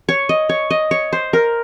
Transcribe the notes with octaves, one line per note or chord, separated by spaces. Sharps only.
C#5
D#5
C#5
D#5
C#5
C5
A#4